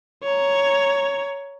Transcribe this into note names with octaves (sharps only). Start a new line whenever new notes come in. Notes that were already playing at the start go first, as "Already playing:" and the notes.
C#5 A#5